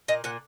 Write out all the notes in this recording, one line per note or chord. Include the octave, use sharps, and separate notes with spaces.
A#2 D#5
A#2 F#5